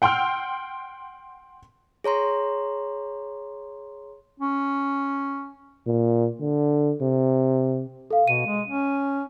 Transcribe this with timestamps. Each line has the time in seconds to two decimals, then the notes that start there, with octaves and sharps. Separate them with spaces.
0.02 F#5 G5 C6 E6 F6
2.04 G#4 C#5 A#5 C6
4.40 C#4
5.87 A#2
6.40 D3
7.01 C3
8.11 A4 F5
8.28 B2 D#7
8.47 G#3
8.68 C#4